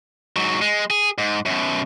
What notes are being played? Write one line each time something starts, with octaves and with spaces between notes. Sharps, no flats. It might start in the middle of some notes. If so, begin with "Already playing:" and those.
G#2 F#3
G#3
G#4
G#2
F#2 B2